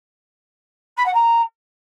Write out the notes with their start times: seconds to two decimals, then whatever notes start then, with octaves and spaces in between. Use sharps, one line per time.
0.97 B5
1.06 F#5
1.14 A#5